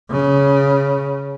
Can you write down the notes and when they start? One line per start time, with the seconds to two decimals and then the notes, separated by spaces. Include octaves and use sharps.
0.11 C#3